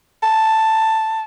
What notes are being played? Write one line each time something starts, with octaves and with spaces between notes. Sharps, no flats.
A5